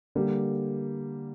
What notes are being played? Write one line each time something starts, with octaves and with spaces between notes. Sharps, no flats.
D3 G3 A#3